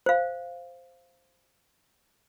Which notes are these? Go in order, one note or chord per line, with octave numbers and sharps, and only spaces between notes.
C5 F5